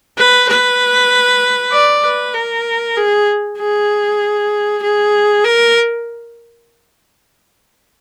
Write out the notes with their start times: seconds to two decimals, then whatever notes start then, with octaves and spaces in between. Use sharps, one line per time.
0.18 B4
0.49 B4
1.72 D5
2.04 B4
2.34 A#4
2.97 G#4
3.59 G#4
4.83 G#4
5.45 A#4